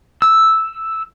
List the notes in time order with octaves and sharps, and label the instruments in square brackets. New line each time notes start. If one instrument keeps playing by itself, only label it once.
[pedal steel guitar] E6